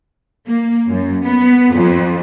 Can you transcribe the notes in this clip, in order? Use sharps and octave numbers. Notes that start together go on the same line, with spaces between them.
A#3
F#2
B3
F2